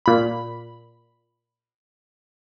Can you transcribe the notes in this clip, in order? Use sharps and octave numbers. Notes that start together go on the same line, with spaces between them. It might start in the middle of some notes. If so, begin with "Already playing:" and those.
A#2 B5